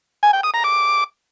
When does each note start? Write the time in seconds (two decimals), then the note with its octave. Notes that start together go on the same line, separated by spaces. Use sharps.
0.23 G#5
0.33 G5
0.43 D#6
0.54 A#5
0.64 D6